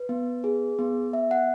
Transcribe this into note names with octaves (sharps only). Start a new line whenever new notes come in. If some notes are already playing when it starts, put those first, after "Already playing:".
Already playing: B4
B3
G#4
B3
B3 E5
F#5